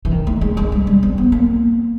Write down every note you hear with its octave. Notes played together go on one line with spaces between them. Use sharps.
E3
D#3
A3
G#3
G#3
G3
G3
C4
B3
A#3